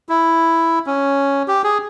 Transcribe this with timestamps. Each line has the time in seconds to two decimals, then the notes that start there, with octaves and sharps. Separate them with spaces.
0.09 E4
0.87 C#4
1.48 G4
1.64 G#4